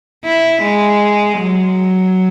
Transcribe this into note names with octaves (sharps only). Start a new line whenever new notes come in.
E4
G#3
F#3